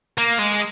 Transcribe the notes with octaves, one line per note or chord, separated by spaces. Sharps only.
A#3
G#3